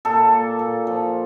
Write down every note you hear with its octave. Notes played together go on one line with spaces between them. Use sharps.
A#2 A4
A#3
A#2
F3